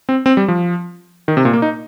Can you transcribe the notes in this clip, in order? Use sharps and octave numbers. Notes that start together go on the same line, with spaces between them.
C4
C4
G3
F3
D#3
C3
A#2
A#3
D#4